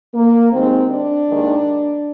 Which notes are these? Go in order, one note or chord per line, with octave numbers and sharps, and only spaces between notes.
A#3
D#2 D#3 G#3 C4
D4
D#2 D#3 G#3